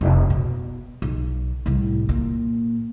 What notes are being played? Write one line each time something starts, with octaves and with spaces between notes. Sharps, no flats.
F1
B2
B1
C2 A2
A#2